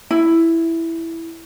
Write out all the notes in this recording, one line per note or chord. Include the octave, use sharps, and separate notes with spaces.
E4